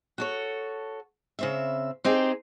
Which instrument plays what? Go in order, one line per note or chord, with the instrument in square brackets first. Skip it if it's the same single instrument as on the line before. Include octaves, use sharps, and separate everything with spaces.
[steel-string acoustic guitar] F#4 A4 C#5
C#3 C4 E5
C4 D#4 G4 G#4